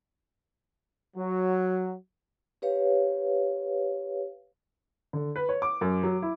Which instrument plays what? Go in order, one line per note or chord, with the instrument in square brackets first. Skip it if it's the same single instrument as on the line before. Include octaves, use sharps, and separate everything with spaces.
[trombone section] F#3
[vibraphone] G4 B4 C#5 F5
[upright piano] D3
B4
C#5
D6
F#2
F#3
E4